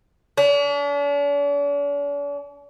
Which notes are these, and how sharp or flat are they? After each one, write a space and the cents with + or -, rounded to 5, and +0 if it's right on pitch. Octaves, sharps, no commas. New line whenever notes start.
D4 -45